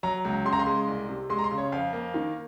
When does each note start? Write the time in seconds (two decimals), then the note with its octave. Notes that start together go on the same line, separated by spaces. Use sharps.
0.03 F#3 A#5
0.25 C#2
0.45 C#3 C6
0.53 A#5
0.59 C6
0.67 G#3
0.87 C2
1.09 C3
1.30 G#3 C6
1.39 A#5
1.44 C6
1.51 C#3
1.58 C#5
1.72 F2 F5
1.93 A#3
2.14 D#3